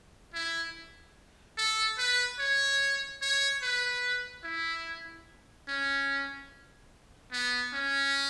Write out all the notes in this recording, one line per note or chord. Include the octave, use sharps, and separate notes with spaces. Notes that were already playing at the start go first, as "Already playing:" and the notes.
E4
A4
B4
C#5
C#5
B4
E4
C#4
B3
C#4